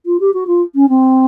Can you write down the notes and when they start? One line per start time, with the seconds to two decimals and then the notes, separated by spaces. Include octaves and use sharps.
0.06 F4
0.20 G4
0.33 F#4
0.47 F4
0.75 C#4
0.89 C4